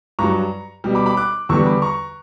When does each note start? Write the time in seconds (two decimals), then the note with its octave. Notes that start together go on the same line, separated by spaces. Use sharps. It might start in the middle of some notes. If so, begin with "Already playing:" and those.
0.19 G2 F#3 A#5 C#6
0.84 B2 G3
0.95 B5 D6
1.06 B5 D6
1.17 D6 F#6
1.49 E2 D3 G3 C#6 E6
1.66 B5 D6
1.82 A#5 C#6